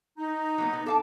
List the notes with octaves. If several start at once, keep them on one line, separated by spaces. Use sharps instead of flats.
D#4
F#3 A#3 B3
B3
A4 F5 A5 D6